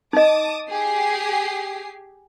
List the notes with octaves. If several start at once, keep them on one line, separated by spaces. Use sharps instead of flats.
D#4 D#5 A5 D6 D#6
G4 G#4 C7